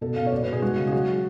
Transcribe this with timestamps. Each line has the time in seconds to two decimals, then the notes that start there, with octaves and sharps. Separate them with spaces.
0.01 B2 A4
0.16 B2 F5
0.26 C#5
0.32 B2 D5
0.43 B4
0.47 B2
0.53 G#4
0.62 G#3 F#4
0.77 C#3
0.87 G#4
0.92 F#3 F#4